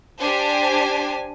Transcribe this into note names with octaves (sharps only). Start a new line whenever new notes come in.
D4 G4 C5 G#5